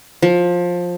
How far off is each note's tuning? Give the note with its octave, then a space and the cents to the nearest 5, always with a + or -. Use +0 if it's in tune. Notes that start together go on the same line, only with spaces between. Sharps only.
F3 +15